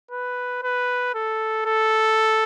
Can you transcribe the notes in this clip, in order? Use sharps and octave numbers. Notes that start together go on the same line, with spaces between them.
B4
B4
A4
A4